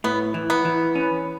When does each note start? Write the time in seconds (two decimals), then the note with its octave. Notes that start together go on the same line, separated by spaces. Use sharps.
0.04 A2 B3
0.34 E3
0.50 B3
0.65 E3
0.95 C#4